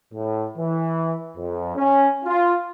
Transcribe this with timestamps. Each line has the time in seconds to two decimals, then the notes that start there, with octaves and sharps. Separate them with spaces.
0.13 A2
0.58 E3
1.37 F2
1.76 C#4
2.24 F4